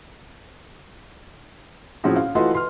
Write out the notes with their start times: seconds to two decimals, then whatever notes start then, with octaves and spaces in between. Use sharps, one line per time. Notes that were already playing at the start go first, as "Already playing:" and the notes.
2.04 A2 F3 C4 C#4 F#4 G#4
2.16 F5
2.35 E3 A3 F4 F#4 B4 D#5
2.53 B4 C6 F6